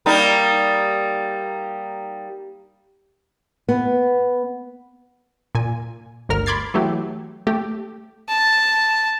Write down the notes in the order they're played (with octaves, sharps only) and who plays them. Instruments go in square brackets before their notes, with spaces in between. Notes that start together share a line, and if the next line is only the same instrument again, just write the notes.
[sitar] G3 A#3 D#4
[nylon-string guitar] B3
[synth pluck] A#2 G#5
G1 D2 A#4 F6
B5 C6 D6 G#6 A6 C7
E3 F#3 A3 G4
A3 G4
[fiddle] A5